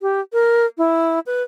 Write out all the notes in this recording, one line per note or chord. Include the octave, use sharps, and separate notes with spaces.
G4
A#4
E4
B4